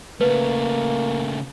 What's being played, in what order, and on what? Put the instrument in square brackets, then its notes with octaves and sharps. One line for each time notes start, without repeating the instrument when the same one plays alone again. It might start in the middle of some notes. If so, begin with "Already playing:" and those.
[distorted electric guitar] C#3 A3 [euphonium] A#3 [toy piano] B4